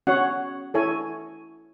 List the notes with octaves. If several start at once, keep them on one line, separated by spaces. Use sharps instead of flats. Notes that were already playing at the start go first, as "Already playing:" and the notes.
C#4 F#4 C#5 F#5
E4 A4 C#5 G#5